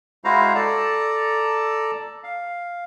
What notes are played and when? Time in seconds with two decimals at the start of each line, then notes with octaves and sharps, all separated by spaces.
0.24 G#3 E4 F#4 C5 F5 A#5
0.55 A4 D5 A5 A#5
2.23 F5